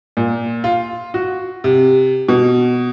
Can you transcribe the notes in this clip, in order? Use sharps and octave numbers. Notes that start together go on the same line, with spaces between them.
A#2
F4
F#4
C3
B2